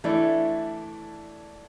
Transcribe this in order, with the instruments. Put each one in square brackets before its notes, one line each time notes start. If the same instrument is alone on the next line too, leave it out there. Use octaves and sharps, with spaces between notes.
[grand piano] E3 D4 E4 [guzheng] A3